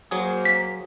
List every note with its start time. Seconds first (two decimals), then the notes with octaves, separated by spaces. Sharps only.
0.11 F#3 A#3 G#4 C5
0.45 B6